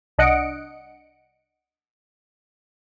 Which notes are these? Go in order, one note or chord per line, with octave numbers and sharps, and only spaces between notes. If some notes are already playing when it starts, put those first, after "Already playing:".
C2 D4 D#5 F#5 C#7 D7